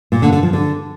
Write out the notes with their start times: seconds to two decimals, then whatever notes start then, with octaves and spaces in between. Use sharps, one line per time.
0.12 A#2
0.22 D3
0.33 D3
0.43 F3
0.53 D3